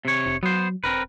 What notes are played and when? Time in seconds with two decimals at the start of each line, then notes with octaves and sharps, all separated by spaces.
0.05 C3 C#5
0.26 F1
0.43 F#3 B3 C5
0.84 E1 C4 A#4 B4